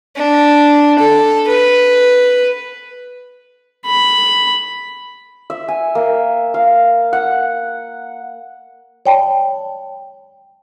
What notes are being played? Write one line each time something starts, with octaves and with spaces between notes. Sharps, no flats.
D4
A4
B4
B5
E5
G#5
A#3
F5
F#5
C#5 D5 G5 A5 B5